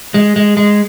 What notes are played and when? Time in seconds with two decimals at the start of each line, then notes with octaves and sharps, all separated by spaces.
0.14 G#3
0.36 G#3
0.57 G#3